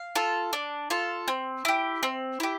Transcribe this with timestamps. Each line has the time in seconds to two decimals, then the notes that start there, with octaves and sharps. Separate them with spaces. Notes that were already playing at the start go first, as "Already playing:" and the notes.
Already playing: F5
0.15 F4 A4
0.53 D4
0.90 F4 A4
1.28 C4
1.65 E4 G4
2.03 C4
2.40 E4 G4